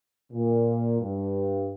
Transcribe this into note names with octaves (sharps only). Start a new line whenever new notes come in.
A#2
G2